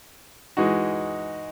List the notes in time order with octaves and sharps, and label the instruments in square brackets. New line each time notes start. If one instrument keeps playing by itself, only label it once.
[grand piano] E3 G#3 D#4 F#4